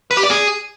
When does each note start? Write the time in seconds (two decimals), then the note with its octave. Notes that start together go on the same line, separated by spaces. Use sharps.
0.11 B4
0.17 G4
0.23 D5
0.30 G#4